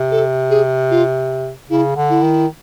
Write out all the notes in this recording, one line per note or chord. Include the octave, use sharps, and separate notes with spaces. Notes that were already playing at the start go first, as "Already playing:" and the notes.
Already playing: C3
A4
G#4
F4
C#3 E4
D3
E4
D#3